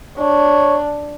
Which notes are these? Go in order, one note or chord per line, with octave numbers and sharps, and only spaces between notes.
D4 C#5